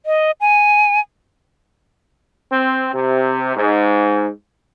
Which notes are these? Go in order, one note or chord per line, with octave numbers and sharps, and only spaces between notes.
D#5
G#5
C4
C3
G#2